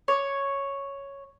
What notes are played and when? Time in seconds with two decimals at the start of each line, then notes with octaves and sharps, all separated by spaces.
0.08 C#5